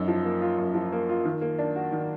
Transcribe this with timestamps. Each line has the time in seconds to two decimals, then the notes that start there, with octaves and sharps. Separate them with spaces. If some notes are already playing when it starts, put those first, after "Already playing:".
Already playing: F#2 D#4
0.08 F3
0.25 A#3
0.42 F4
0.58 F#2
0.75 F3
0.92 A#3
1.09 F4
1.25 D#3
1.41 A#3
1.59 D4
1.76 F#4
1.92 D#3